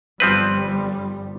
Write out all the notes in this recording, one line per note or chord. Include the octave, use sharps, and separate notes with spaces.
G1 F3 G3 C4 B4